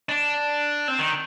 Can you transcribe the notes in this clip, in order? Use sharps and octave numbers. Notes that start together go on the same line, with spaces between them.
D4
C4
D#3